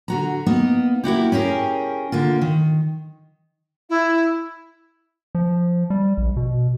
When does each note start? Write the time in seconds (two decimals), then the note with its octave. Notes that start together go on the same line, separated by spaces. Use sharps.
0.08 D3 F#4 A#5
0.46 A#3 B3 D#4
1.04 A#3 E4 F#4 G4
1.32 C#4 G4 G#4 A#4
2.12 D3 A#3 F4
2.41 D#3
3.89 E4
5.35 F3
5.90 G3
6.17 A#1
6.37 B2